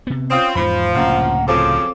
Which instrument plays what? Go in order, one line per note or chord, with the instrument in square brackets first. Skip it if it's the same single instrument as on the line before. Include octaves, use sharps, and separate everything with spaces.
[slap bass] C3 B3
[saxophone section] C4 [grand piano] C#4 F4 [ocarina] D#6
[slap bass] E2 G#2 [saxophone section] F3 [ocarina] C5 [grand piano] B5
[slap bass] C#2 A2 C3 [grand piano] F#2 A#3 [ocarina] F#5
[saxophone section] F#2 C#3 F3 [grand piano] C4 F4 A4 [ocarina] D6